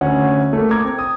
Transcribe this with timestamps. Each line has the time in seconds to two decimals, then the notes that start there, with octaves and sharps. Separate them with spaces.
0.01 D2 C#4 F#5
0.53 A3 A#3
0.71 A#5 D6 G#6
0.84 C4
0.99 D#6